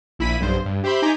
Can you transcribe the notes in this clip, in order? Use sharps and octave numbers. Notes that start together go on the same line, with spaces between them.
A#1 E4 B5 B6 D#7
B1 G2 C5
G2
G4 C5 E5 B5 C6 G6
D#4 G#5 A#5 D6 G6 B6